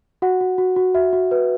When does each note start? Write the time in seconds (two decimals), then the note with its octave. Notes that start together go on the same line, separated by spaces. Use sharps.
0.22 F#4 F#5
0.41 F#4
0.58 F#4
0.76 F#4
0.95 F#4 E5
1.13 F#4
1.31 B4